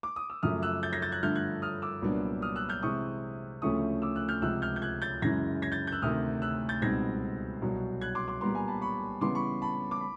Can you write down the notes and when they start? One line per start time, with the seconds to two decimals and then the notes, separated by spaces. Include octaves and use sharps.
0.03 D6
0.16 D#6
0.30 E6
0.43 F#2 C#3 F3 A3 D#6 F6
0.62 E6 F#6
0.83 G6 A6
0.93 G#6 A#6
1.02 G6 A6
1.12 F#6 G#6
1.23 G2 D3 F3 A3 F6 G6
1.35 F#6 G#6
1.62 D#6 F6
1.82 D6 E6
2.02 C2 A#2 F#3 B3 D4
2.42 D#6 F6
2.56 E6 F#6
2.69 F6 G6
2.82 C3 E3 G#3 C4 C#6 D#6
3.62 D2 C#3 F3 A3 C#4 C#6 D#6
4.02 D6 E6
4.16 E6 F#6
4.29 F6 G6
4.42 C#2 C3 F3 E6 F#6
4.62 F6 G6
4.76 G6
4.82 F#6 G#6
5.02 G6 A6
5.22 F#2 C#3 E3 G#3 G#6 A#6
5.62 G#6 A#6
5.72 G6 A6
5.87 G6
5.92 E6 F#6
6.02 D2 C3 D#3 D#6 F6
6.42 E6 F#6
6.69 G6 A6
6.82 C#2 B2 G3 C4 D#4 G#6 A#6
7.62 C2 B2 F#3
8.01 F#6 G#6
8.15 C6 D6
8.28 C6 D6
8.41 A#2 G3 B3 A#5 C6
8.55 G#5 A#5
8.68 A5 B5
8.81 B5 C#6
9.21 C#3 E3 G3 B3 C6 D6
9.35 B5 C#6
9.62 A5 B5
9.91 D6
10.01 B5